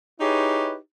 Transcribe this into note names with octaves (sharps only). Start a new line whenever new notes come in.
D#4 E4 G4 G#4 B4 C#5